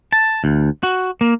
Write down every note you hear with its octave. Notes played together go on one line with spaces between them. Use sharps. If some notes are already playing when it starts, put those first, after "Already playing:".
A5
D2
F#4
A#3